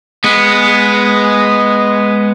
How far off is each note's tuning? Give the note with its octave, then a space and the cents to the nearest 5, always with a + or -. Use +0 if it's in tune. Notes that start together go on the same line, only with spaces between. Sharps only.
G#3 +0 B3 +0